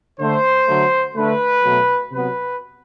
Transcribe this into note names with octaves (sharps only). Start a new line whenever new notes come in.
D3 A3 C5
D3 F#3 A3
D3 A3 B4
B2 F#3 A3
C3 F#3 B3 B4